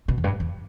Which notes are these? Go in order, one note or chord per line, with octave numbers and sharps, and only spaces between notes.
B2
E2
G2
E2